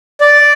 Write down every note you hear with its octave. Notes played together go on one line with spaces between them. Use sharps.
D5